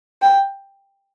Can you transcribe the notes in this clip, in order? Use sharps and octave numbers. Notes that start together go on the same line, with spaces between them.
G5